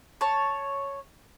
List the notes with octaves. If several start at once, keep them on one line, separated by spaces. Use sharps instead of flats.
C#5 A5